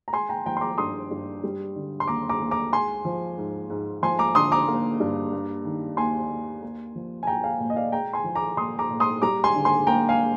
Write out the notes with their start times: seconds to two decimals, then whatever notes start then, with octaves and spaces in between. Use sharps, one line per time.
0.08 A#5
0.13 G#3 G#5 C6
0.29 G5 A#5
0.46 F3 G5 A#5
0.57 C6
0.61 A#5 D6
0.78 G2 C6 D#6
1.11 G2
1.44 G3
1.76 D3
2.00 C6
2.07 D#2 A#5 D6
2.29 A#5 D6
2.40 D#2
2.51 A#5 D6
2.73 G#3 G#5 C6
3.05 F3
3.38 G#2
3.70 G#2
4.02 F3 G#5 C6
4.19 A#5 D6
4.35 D3 C6 D#6
4.52 A#5 D6
4.68 A#3
5.00 G2
5.33 A#3
5.65 D#3
5.97 D#2 G#5 C6
6.30 D#2
6.63 A#3
6.95 F3
7.23 G#5
7.27 A#2 G5 A#5
7.43 F5 G#5
7.60 A#2
7.70 D#5
7.76 D5 F5
7.92 G#3 G5 A#5
8.13 G#5 C6
8.24 F3
8.35 A#5 D6
8.57 A#2 C6 D#6
8.79 A#5 D6
8.90 A#2
9.00 C6 D#6
9.22 G3 A#5 D6
9.44 G#5 C6
9.55 D3
9.65 G#5 C6
9.87 A#3 G5 A#5
10.09 F5 G#5